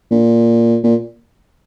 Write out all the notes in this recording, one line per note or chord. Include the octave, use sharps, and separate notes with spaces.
A#2
A#2